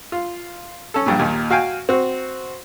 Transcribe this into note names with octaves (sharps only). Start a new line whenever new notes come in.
F4
C#4 A4
A#1 G2 A#2
D#2 A#2 D#3
F#4 F5 G5 G#5
C4 F#4